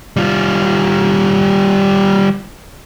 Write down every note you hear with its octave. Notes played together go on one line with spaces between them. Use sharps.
G3 F4